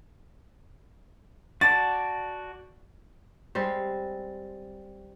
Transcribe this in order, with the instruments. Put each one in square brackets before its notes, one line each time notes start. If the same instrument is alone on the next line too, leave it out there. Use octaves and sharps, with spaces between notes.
[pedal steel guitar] F#4 D5 A5 [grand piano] A6
[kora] G3 G#3 C4